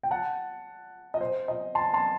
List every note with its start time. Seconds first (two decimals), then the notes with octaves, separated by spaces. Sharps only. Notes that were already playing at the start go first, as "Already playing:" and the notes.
0.03 G5
0.11 F#5 A5
1.14 D#5
1.21 C5
1.48 D#5
1.75 A5 C6
1.94 A5 C6